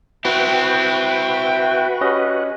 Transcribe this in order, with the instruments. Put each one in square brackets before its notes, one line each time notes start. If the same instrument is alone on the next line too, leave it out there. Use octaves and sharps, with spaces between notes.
[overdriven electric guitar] C4 E4 [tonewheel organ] F#4 B4 [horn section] E5 G5
[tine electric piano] C#4 G4 D#5